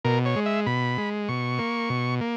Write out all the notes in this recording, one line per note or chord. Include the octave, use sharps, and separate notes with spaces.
B2 A#4
C#5
G#3
E5
B2 B5
G#3
B2 C#6
A#3
B2
A#3